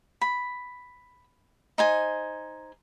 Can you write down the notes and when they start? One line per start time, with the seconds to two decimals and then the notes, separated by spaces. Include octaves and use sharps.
0.21 B5
1.78 D#4 C5 G#5